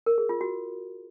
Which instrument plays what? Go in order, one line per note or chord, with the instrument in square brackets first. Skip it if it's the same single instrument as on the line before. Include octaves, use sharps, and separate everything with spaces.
[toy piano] A#4
G#4
F4
F#4